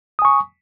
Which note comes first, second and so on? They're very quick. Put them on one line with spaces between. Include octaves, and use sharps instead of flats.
D#6 G#5 C#6